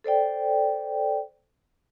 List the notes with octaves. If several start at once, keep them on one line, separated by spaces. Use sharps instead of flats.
A4 C5 D5 G5